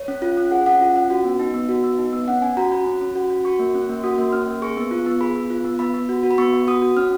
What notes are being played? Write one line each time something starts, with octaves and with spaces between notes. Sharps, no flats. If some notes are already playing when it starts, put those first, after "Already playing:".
Already playing: C#5
C#4
F4
C#4
G#4 F#5
C#4 F#5
F4
C#4
F#4
B3
D#4
B3
F#4
B3
D#4
B3
C#4 F#5
C#4 G#5
F#4 A#5
F#4 B5
C#4
C#4
F#4
F#4
F#4 C#6
A#3
C#4
A#3
F#4 D#6
A#3
C#4 F6
A#3
G#4 C#6
B3
F4
B3
G#4 B5
B3
F4
B3
B3 B5
B3
F#4
F#4
B5
B3 C#6
B3
F#4 D#6
F#4
C#4 F6